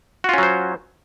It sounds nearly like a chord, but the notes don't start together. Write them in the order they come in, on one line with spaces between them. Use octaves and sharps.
F#4 F4 C#4 F#3 C5